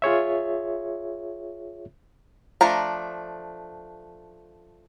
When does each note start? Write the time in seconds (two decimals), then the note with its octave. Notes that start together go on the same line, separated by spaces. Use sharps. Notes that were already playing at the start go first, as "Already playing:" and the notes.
0.02 F4 G#4 C#5 E5
2.61 F3 A3 D4 A#5